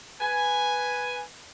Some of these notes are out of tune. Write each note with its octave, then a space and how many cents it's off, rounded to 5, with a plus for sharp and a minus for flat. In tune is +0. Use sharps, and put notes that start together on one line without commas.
B4 +0 G#5 +0